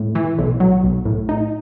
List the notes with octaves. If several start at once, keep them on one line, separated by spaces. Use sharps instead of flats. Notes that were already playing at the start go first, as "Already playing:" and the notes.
Already playing: A2
E3
B1
F#3
B1
A2
D#4